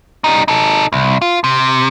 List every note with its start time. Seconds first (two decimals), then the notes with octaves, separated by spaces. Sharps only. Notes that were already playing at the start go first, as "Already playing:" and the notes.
0.24 G3 D#4
0.48 D#4 A4
0.93 C2
1.22 F4
1.44 C3